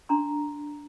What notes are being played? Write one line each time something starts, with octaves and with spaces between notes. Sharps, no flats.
D4 A#5 C6